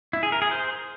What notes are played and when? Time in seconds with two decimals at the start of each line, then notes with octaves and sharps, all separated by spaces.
0.13 E4
0.23 G#4
0.32 A#4
0.42 G#4
0.51 C5